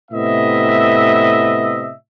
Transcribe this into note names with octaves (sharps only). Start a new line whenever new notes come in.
A2 C3 B3 D#5 E5